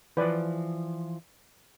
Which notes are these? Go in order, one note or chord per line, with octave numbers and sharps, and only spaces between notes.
E3 F3 B4 D5